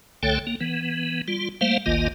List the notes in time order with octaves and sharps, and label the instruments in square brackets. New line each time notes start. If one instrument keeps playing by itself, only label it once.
[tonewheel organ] C2 D3 A3 A4 C#5 G5
A#3
E3 B3
G3 F4
G3 A3 A#3 C5 F5
G#1 D2 D#3 A#3 F4 D#5